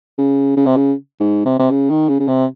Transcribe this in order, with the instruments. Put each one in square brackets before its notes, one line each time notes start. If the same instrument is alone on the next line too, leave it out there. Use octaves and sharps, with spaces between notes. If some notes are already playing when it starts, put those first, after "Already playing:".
[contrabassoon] C#3
C#3
C3
C#3
G#2
C3
C3
C#3
D#3
C#3
C#3
C3